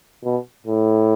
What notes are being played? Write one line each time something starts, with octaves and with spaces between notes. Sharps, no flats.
B2
A2